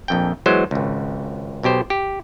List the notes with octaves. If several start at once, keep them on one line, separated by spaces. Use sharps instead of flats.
A#1 F2 G5
E3 F#3 G#3 B3 C5
G#1 C#2
B1 B2 G4 C5
G4